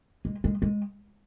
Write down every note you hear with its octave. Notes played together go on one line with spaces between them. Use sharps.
G#3
G#3
G#3